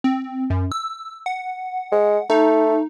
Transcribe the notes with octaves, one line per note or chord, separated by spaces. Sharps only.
C4
F#2
E6
F#5
G#3
A3 D#4